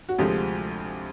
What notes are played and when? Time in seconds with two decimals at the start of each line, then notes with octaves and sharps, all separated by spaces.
0.09 F#4
0.19 D2 C3 F3 G#3 G4